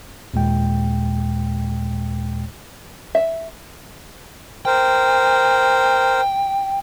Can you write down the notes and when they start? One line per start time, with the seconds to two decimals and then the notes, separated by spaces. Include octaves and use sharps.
0.34 D#2 A#2 G#3 G5
3.15 E5
4.65 A#4 C5 G5